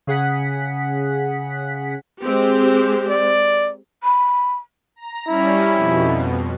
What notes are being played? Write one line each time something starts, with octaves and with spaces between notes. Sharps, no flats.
C#3 G#4 F#5 B6
G#3 C4 G4
D5
B5
A#5
G3 C#4 E4
F2 B2